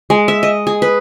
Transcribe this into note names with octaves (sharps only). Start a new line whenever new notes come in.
G#3
E5
D#5
G#4
B4